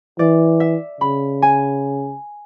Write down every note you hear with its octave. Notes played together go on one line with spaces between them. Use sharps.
E3 D5
E5
C#3 B5
G#5